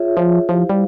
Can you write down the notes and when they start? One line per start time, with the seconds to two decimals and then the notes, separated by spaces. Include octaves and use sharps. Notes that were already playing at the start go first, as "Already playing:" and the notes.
Already playing: F4 G#4 C#5 E5
0.17 F3
0.48 F3 E4 G4 C5 F5
0.70 G3